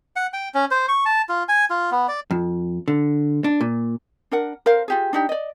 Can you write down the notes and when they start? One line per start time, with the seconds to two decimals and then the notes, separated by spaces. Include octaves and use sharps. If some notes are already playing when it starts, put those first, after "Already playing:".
0.16 F#5
0.33 G5
0.54 C#4
0.71 C5
0.89 C#6
1.05 A5
1.29 F4
1.49 G#5
1.70 F4
1.91 B3
2.08 D5
2.31 F2
2.88 D3
3.44 D4
3.61 A#2
4.31 D4 A#4 F#5
4.66 A#4 C5 F5
4.88 F4 G4 G#4
5.13 D4 D#4 G4
5.29 D5 D#5